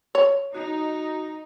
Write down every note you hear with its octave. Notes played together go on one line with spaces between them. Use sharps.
C#5
D#4 F#4